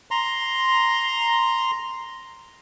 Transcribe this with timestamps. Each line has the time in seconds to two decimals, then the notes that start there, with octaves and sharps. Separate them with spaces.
0.11 A#5 C6